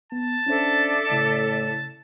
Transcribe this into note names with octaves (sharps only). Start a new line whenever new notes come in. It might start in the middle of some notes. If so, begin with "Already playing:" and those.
B3 A5
C#4 D4 A4 C5 D5 E5
A2 C#3